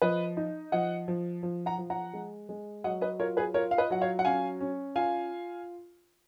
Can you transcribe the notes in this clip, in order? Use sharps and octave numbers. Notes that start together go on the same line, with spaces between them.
F3 B4 D#5
D#4
F3 D#5 F#5
F3
F3
F#5 A#5
F3
F#5 A#5
G#3
G#3
F#3 D#5 F#5
B4 D#5
F4 A#4 C#5
G#4 B4
F4 A#4 C#5
F5
B4 D#5
F#3 F#5
C#5 F5
F#5
C#4 F5 G#5
C#4
F4 F5 G#5